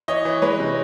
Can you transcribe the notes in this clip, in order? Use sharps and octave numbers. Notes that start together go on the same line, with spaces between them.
E3 C#5 D#5
E3
G#3 B4 C#5
C3